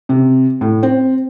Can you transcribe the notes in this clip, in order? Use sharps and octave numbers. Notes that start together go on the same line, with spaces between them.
C3
A2
C4